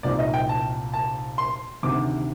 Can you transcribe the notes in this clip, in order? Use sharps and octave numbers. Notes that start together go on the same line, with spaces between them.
C2 A#2 F3 C4 D#4 D5
D#5
G5
A5
A5
C6
D2 C3 D#3 D6